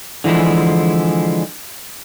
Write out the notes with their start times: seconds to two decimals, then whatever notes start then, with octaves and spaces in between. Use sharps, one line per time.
0.24 D3 E3 F3 G#3 E4